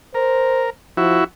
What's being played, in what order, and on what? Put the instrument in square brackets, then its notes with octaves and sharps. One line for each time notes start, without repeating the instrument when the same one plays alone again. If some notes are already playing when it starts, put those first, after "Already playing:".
[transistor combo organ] A#4 [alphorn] C5
[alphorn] F3 [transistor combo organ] E4 F#4